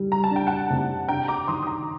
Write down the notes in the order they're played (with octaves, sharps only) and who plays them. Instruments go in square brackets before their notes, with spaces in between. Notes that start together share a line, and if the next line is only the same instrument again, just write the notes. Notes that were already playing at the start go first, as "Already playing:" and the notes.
Already playing: [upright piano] G3
[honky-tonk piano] A#5
A5
[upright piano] D4 [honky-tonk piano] G5
[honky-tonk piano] F#5 A5
[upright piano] C3
[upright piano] D4 [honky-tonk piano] G5 A#5
[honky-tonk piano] A#5 D6
[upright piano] D#3 [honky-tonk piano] C6 D#6
[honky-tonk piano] D#6
A#5 D6